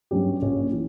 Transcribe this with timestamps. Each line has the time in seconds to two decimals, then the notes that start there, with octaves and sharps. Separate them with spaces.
0.11 G2 F#3 C#4 G4
0.42 A#1 A#2 A#3 C#4
0.73 E3